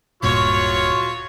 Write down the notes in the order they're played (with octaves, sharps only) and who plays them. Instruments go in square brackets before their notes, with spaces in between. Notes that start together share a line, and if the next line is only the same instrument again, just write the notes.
[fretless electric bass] D1 G2 A#2 [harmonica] F#3 F4 C#6 [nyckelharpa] C#5